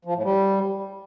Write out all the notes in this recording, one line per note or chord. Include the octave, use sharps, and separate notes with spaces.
F3
A2
G3